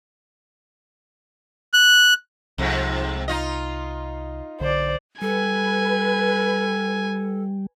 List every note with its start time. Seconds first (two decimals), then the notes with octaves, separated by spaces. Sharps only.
1.73 F#6
2.58 C2 F2 G#2 C3
3.28 D#4 F4 D#5
4.60 B1 D3 C5 D5
5.22 G3 A4 B4 G#5